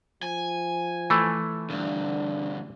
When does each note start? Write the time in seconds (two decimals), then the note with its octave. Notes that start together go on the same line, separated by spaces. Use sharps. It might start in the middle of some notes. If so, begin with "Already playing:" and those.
0.23 F3 G#5
1.10 E3 A3
1.70 D2 G2 D4